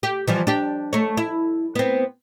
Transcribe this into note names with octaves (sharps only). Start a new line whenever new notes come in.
G4
E3 F3 G3
D4 G4
A3 C#5
E4
B3 C4